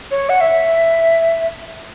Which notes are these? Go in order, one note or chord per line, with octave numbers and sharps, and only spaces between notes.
C#5
F#5
E5